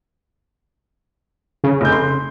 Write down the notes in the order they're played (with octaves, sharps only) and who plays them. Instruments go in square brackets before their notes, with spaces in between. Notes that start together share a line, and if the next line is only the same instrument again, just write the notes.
[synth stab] C#3
[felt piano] F1 G6
C6